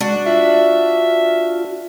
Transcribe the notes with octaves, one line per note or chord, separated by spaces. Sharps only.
G#3 D4 F#4
F4 E5